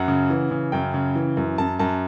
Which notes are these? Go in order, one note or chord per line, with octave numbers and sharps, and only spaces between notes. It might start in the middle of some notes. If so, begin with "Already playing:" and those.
Already playing: F#2 F#5
C#3
E3
C#3
F#2 G5
C#3
E3
F#2
F#2 A5
F#2 A5